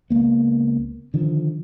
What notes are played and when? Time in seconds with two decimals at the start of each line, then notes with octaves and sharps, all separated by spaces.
0.10 C#2 A#3 B3
1.14 D3 D#3 F3